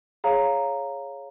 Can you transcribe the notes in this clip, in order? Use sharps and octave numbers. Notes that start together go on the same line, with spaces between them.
G#4 C#5 F5 A#5